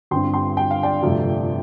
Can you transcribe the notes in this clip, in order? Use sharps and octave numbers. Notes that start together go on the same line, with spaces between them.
G1 G2 G3 C4 G5 C6
G5 C6
G5
F5
D5 G5
G1 F2 C3 A3